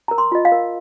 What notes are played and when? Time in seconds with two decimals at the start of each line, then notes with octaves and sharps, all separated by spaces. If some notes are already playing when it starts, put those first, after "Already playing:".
0.08 A#4 A#5
0.18 C6
0.32 F4 D#5
0.45 F5
0.52 A#4